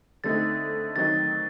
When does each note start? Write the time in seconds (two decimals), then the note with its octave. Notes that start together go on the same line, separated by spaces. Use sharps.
0.24 D3 A3 C4 D#4 A6
0.96 D#3 F#3 C4 D#4 A6